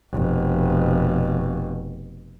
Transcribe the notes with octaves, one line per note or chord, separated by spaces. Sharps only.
F1 B2